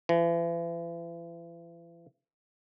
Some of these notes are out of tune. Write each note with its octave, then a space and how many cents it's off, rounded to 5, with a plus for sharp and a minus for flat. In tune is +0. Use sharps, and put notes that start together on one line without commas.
E3 +40